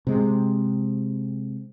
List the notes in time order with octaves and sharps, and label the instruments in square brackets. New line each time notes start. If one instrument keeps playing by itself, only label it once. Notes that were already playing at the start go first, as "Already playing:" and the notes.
[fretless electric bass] C3 G#3